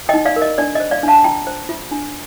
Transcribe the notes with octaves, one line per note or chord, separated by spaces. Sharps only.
D#4 D#5 G5
D5 F5
A#4
D#5
D4 D5
C5 D#5
D5 F5
D4 F5 A5
F4 G5 A#5
C5
F4
D4